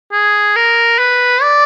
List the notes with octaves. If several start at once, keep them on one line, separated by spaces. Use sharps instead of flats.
G#4
A#4
B4
D5